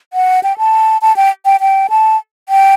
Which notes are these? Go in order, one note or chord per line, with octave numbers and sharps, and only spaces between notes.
F#5
G5
A5
A5
G5
G5
G5
A5
G5